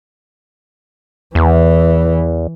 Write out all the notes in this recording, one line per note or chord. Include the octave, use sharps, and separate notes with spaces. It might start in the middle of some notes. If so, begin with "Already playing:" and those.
E2 E3